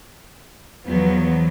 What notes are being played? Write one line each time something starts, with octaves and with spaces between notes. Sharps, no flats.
E2 F3 F#3 B3